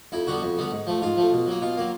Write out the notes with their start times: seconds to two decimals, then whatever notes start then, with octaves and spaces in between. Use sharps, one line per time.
0.12 F2 E4
0.27 D3 G3 B3 F#4
0.42 F2
0.57 D3 G3 B3
0.72 G#2
0.87 F3 A3
1.02 G#2 F4
1.17 F3 A3
1.32 B2
1.47 F#3 A#3
1.62 B2 F4
1.77 F#3 A#3